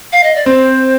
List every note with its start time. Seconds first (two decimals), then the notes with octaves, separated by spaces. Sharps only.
0.12 F5
0.24 D#5
0.36 D5
0.46 C4 C5